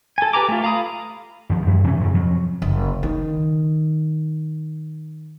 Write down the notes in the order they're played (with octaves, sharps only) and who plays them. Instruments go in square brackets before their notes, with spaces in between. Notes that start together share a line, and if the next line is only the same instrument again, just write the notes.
[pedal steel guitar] A4 G#5
G4 B4 G#5 A#5 D6
A3 F4
F5 A#5 B5 D#6
[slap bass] D#2 F3
F#2 G#3
C3 E3 G#3 C#4
D#1 F#2 C#3
F2 F#3
[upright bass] F#1
D#3